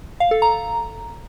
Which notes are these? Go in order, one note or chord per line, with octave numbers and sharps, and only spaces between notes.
F5
A4
A#5